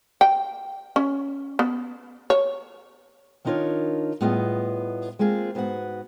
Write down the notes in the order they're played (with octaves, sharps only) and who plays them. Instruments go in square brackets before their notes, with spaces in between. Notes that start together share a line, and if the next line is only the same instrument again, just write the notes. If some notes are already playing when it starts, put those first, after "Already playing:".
[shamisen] G5
C#4
B3
C#5
[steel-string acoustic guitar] D#3 D4 D#4 F4 A#4 C#5
A2 G3 B3 F4 G#4 D#5
G#3 A#3 C4 F4 G#4
G#2 B3 F#4 G#4 F#5